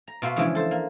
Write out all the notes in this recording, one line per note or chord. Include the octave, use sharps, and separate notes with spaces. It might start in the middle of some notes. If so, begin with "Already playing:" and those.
A#5
B2 F4 F#4 E5 C6
C#3 E3 F3 G#3 D4 E4
A4 C5 A5
A#3